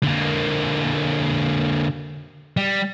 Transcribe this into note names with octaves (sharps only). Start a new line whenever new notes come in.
D3 A#3
G3